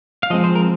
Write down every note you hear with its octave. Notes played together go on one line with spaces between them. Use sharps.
F5
F3 G#3 C4 D#5
C5
A#4